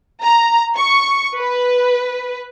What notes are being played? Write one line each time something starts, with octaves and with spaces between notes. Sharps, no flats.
A#5
C#6
B4